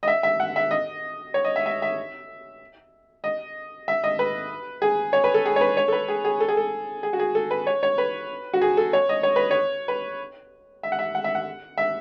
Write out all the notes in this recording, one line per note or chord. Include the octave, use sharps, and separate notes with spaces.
D#5
E5
E5
F#5
E5
D#5
C#5
D#5
E5
E5
E5
D#5
E5
D#5
B4
G#4
C#5
B4
A4
G#4
C#5
B4
C#5
A4
B4
G#4
G#4
A4
G#4
A4
G#4
F#4
G#4
A4
B4
C#5
C#5
B4
F#4
G#4
A4
C#5
D#5
C#5
B4
C#5
B4
E5
F#5
E5
F#5
E5
F#5
E5